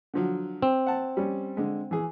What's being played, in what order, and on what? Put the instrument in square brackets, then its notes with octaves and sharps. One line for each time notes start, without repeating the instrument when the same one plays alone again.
[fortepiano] D3 F3 F#3
[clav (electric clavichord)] C4
[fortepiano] F#5 A5
G3 C#4
D3 G#3
E3 G#4